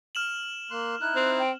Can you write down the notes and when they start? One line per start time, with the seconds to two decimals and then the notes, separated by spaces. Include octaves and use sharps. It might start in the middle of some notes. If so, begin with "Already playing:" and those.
0.15 F6 E7 F#7
0.71 A#3 C6 F#6
1.01 D#4 E4 F#6
1.16 C4
1.39 G5